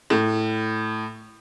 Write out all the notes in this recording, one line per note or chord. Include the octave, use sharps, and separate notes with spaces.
A2